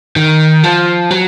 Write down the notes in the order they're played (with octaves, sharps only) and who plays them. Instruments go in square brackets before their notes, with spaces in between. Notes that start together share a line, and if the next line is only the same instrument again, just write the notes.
[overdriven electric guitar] D#3
F3
F#3